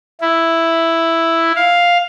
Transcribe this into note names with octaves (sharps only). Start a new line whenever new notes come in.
E4
F5